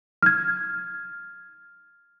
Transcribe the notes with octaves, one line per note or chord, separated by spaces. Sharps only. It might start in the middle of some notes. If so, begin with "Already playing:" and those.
F6 G#6